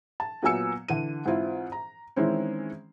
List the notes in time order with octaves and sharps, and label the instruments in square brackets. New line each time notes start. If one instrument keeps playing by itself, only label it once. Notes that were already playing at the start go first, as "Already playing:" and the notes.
[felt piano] A5
A#2 F#3 B3 G#5 E6 C#7
D3 E3 D#7
G#2 E3 C4 E4 F4
A#5
D#3 E3 G#3 C4 C#4 E4